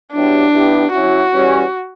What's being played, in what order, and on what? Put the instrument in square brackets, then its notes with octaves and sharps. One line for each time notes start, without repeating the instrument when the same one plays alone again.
[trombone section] F#3 B3 E4 G4 [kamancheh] D4
[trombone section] E3 B3 E4 G4
[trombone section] F#3 C#4 E4 [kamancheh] F#4
[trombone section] E3 G3 C#4 G4